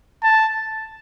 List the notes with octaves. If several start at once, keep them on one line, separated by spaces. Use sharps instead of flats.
A5